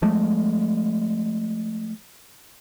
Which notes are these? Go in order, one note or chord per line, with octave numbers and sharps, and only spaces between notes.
F3 G#3 A3